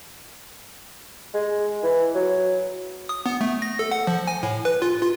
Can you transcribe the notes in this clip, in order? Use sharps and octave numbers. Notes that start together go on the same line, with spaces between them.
G#3
E3
F#3
D#6
B3
A3
A#6
A4
F#5
F3
G#5
A2
B4
F4
F4